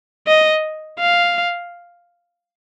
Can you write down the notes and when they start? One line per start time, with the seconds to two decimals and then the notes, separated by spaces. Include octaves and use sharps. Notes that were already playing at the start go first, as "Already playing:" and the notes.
0.27 D#5
0.99 F5